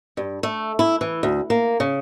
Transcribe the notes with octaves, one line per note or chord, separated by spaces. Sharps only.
G2
A3
E4
E3
D2
A#3
C#3